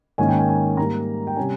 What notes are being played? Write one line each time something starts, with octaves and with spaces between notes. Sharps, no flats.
G#2 D#3 A#3 C#4 G#5
G5
G#5
G#5
G#2 G3 A#3 A#5
G5
C3 G3 C#4 G#5